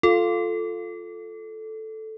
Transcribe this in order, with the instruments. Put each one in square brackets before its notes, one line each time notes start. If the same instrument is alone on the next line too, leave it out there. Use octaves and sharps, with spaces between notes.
[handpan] F4 [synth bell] A4